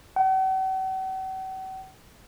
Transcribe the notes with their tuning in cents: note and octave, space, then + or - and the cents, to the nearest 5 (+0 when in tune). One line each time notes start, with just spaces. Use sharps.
F#5 +45